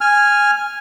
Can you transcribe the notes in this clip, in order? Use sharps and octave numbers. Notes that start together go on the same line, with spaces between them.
G#5 F6